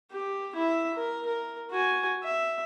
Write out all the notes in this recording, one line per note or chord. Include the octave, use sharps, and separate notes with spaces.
G4
E4 E5
A#4
A#4
F#4 G#5
E5